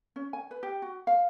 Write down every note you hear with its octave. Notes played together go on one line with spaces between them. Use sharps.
C#4
G#5
B4
G4
F#4
F5